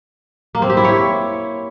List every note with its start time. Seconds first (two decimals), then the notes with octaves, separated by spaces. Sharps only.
0.55 A#3
0.62 C4
0.70 G4
0.77 E4
0.85 C#5